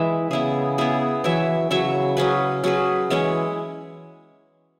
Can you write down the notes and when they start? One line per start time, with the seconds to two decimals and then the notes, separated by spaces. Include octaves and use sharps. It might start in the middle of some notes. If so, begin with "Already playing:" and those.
Already playing: E3 G#3 E4 B4 E5
0.30 C#3 B3 E4 G#4
0.78 B3 E4 G#4
1.24 E3 F#3 E4 C#5 E5
1.71 C#3 F#3 E4 C#5 E5
2.17 F#3 C#4 G#4 B4
2.64 F#3 C#4 G#4 B4
3.09 E3 G#3 C#4 E4 C#5